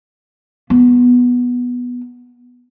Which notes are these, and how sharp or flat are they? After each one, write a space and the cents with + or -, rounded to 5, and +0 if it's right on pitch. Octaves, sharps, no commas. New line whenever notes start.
B3 -5